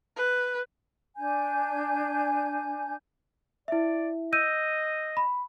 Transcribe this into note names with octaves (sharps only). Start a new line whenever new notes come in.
B4
D4 G#5 G6
E4 D5 E5
D#5 E6 G6 D#7
B5